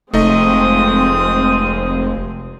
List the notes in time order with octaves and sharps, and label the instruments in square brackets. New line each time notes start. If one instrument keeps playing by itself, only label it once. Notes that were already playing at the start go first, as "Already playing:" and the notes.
[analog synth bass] F1 [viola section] F3 G#3 C4 [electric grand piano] A3 D#4 D#5 [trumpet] D#6